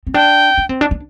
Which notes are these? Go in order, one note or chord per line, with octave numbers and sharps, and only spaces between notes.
C4
D4 G5
D4
C4
D4
D4